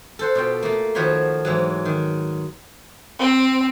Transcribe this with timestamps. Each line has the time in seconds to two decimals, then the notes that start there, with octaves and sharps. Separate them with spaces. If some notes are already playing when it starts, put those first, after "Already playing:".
0.19 A4 C5 F#5
0.35 B2 F4 G5
0.63 A3 A#3
0.95 D#3 F3 F#4 C#5 B5 C6
1.45 G#2 E3 F#3
1.85 D#3
3.19 C4